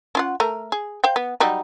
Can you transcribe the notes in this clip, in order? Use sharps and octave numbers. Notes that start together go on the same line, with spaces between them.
C#4 F4 F#5
A3 A#4
G#4
C5 F5 G5
B3
F#3 G3 D#4